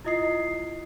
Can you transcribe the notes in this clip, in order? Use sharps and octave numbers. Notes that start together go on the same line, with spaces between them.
E4 F4 D#5 D#6 C7